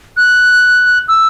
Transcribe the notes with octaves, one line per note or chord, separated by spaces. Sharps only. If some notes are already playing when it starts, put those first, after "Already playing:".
F#6
E6